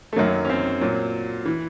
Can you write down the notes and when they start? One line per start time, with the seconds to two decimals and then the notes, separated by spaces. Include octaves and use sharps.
0.13 A3
0.16 F#2 D#3 F#3 A#3
0.45 C#4
0.50 C4
0.81 A#2 F#3
1.45 E3